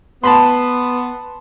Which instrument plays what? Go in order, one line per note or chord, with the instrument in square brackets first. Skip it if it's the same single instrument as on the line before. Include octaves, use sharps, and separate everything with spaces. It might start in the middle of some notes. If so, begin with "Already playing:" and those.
[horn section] B3 [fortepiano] A5 B5 C6